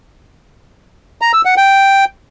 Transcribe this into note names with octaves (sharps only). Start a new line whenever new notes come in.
A#5
E6
F#5
G5